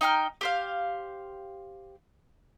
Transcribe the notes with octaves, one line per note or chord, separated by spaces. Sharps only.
D#4 G5 B5 F6
G4 C5 F5